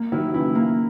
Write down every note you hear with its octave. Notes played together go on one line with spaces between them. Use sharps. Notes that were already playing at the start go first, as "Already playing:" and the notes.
Already playing: A#3
D#3 F#3 E4
C#3 E3 E4
A#3